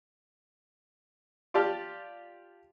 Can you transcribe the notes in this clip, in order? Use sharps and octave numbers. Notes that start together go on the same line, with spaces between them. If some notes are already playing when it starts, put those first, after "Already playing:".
F4 G4 D5 A5 F6